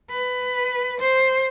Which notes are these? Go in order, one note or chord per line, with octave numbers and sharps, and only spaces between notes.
B4
C5